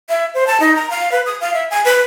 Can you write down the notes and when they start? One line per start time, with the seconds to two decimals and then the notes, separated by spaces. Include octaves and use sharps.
0.09 E5
0.34 C5
0.47 A5
0.60 D#4
0.75 A#5
0.90 F5
1.12 B4
1.26 D#6
1.41 F5
1.54 E5
1.71 G#5
1.85 B4